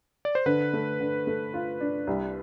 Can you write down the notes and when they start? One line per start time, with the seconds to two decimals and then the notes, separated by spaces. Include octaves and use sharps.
0.25 D5
0.35 C5
0.46 D3 B4
0.73 A3
1.00 D3
1.27 A3
1.54 F4
1.81 D4
2.07 C2